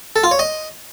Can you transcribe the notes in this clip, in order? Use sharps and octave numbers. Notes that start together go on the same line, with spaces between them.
A4
F4
C#5
D#5